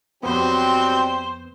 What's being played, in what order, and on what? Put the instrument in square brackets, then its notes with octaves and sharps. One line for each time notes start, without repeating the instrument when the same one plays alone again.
[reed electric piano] F2 B3 [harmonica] F#3 G3 G5 [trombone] C4 [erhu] C5